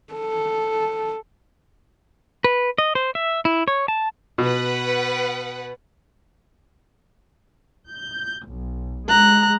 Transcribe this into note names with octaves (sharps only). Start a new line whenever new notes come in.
A4
B4
D#5
C5
E5
E4
C#5
A5
B2 B4 F#5
G6
B1
G#3 A#5 F#6